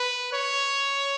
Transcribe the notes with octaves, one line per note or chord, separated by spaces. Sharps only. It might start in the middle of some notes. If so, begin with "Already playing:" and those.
Already playing: B4
C#5